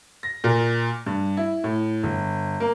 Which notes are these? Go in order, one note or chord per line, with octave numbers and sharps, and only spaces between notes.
A#6
A#2
G2
E4
A2
G1
A#3